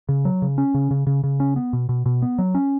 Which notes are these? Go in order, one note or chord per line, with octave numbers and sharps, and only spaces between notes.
C#3
F#3
C#3
C#4
C#3
C#3
C#3
C#3
C#4
B3
B2
B2
B2
B3
F#3
C#4